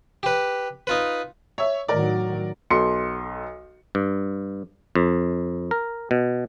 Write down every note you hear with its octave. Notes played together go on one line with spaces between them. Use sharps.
G4 B4
D#4 F4 B4
C#5 E5
A2 D#3 F#3 A#4 D5
B1 A4 C6 C#7
G2
F2
A#4
B2